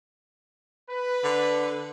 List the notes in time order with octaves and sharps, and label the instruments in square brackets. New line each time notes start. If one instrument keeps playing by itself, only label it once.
[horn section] B4
[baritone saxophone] D3